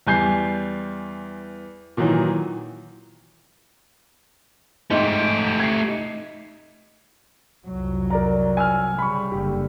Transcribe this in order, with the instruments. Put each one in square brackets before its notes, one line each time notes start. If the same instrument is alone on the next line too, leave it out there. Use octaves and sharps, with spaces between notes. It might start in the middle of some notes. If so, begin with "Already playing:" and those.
[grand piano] E2 G3 G#5 G6 C7
A#2 D#3 E3 F#3
[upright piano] G#2 D#4 C6 [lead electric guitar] A3 G4
[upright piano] G#6 C7
D#4
[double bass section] C2 F2 F#3
[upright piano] A#4 D5 A#5
G#5 E6 F6
[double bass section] C#3 G3 [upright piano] B5 C#6
[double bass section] F#1 D3 [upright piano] G4